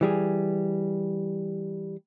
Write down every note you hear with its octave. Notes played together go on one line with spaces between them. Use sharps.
E3 G3 G#4